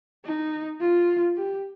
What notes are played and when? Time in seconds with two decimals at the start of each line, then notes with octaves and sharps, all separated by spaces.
0.25 D#4
0.80 F4
1.37 G4